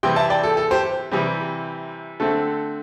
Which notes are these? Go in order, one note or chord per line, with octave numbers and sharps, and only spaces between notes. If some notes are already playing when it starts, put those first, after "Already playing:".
C3 E3 G3 C4 G5 C6
E5 A5
D5 G5
A4
A4
G4 C5
C3 E3 G3 C4 G4
D3 A3 C4 A4